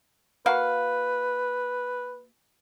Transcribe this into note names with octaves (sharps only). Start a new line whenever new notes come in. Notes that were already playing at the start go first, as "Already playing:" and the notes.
A#3 F#4 B4 F5